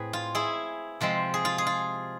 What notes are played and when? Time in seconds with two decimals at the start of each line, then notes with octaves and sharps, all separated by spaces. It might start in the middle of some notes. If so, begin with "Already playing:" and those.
Already playing: A2 C4 G#4 B4
0.13 F4
0.35 E4 G#4
1.01 C3 F3 G#3 C4
1.34 G#4
1.45 F4
1.58 G#4
1.67 F4